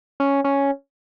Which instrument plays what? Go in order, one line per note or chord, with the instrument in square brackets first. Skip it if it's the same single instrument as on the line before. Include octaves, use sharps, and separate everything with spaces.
[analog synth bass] C#4
C#4